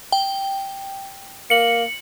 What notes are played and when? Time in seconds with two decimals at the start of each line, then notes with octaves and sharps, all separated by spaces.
0.12 G5
1.50 A#3 C#7 F#7